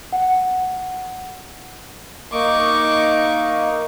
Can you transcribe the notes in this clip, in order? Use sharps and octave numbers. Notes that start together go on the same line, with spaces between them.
F#5
A#3 D#4 C#6 D6